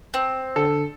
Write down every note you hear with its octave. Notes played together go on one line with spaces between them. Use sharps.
C4
D3 A4